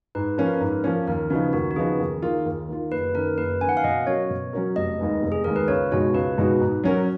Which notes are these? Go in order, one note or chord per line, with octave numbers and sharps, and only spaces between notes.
G#2 B4
F3 A#3 C#4 A#4
B4
A#4
G#2
F3 A#3 C#4
D#2 A#4
C#3 F3 B3 D#4 F#4
D#2 F#4
F#4
C#3 F3 B3 D#4 G#4
D#2
D#3 A#3 F4
D#2
D#3 A#3 F4
F#1 B4
F#2 D#3 A#4
F#1 B4
F#2 D#3 F#5 G#5
F5
B2 D#5
F#3 C#4 F#4 A#4 C#5
B2
F#3 C#4 F#4 A#4
F1 D#5
D#2 D#3 G#3 B3
F1
G#4
D#2 D#3 G#3 B3 A#4
B4
C#2 C#5
B2 G#3 D#4 F#4 C#5
C#2 B4
B2 G#3 D#4 F#4
G#2
F#3 C#4 F#4 A#4